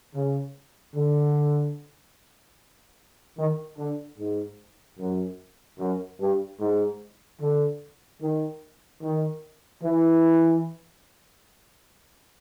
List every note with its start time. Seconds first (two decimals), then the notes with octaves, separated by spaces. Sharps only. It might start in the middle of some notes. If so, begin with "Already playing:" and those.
0.15 C#3
0.96 D3
3.38 D#3
3.78 D3
4.18 G#2
4.99 F#2
5.80 F#2
6.20 G2
6.61 G#2
7.41 D3
8.22 D#3
9.02 D#3
9.83 E3